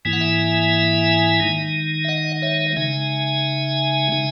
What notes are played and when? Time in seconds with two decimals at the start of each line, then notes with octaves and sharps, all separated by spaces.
0.05 G#2 E3 A#3 E4 G#5
0.13 F#5
0.20 E5 G#5
1.40 D#3 G#3 D#4
2.04 E5
2.08 D#5 F#5
2.42 C#5 E5
2.76 C#3 G#3 D#4 E5 G#5
4.12 C#3 G#3 D#4